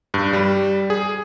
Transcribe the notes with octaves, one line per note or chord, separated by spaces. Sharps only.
G2
G3
G#4